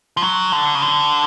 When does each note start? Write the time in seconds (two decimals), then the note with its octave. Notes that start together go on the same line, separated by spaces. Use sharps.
0.17 F3
0.22 F#3
0.52 D3
0.75 C#3
0.82 D3